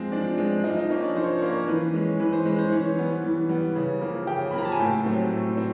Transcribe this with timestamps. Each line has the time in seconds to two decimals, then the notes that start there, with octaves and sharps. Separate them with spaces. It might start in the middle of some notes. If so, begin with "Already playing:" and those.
Already playing: F3 G#3 C4
0.12 F3 D4 D5
0.38 G#3 C4
0.64 F3 D#4 D#5
0.77 D#4 D#5
0.90 A#3 C#4 D#4 D#5
1.03 D4 D5
1.16 F3 C5
1.23 C#5
1.31 C5
1.38 C#5
1.42 A#3 C#4 C5
1.68 E3 B4
1.94 G#3 C#4
2.20 E3 B4
2.33 C5
2.45 G#3 C#4 B4
2.59 C5
2.72 E3 C#4 C#5
2.98 G3 B3
3.24 E3
3.49 G3 B3
3.75 C#3
4.01 F3 A#3
4.27 C#3 G4 G5
4.51 B5
4.53 F3 A#3 A#5
4.65 A5
4.72 G#5
4.79 A2 G4 G5
5.05 F#3 A3 C4
5.31 A2
5.57 C4